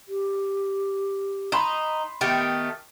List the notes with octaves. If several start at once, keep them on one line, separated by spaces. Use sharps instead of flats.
G4
D#4 B5 C6 E7
D#3 A3 B3 G4